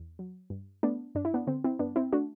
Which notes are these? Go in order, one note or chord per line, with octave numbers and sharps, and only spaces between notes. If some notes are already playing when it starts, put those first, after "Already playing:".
Already playing: E2
F#3
G2
A3 B3 D4
G2 D4
E4
B3 D4
D3 C4
C4 E4
G2 B3 D4
C4 E4
A3 D4 F#4